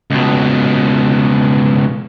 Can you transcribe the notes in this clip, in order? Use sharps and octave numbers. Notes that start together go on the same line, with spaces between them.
C#2 B2